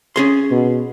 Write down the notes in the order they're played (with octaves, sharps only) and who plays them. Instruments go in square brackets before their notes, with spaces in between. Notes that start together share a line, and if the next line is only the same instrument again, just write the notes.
[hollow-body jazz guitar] C#4 G#4 C6
[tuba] B2